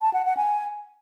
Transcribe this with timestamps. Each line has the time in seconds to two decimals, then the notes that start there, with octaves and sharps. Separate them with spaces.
0.02 A5
0.14 F#5
0.25 F#5
0.37 G#5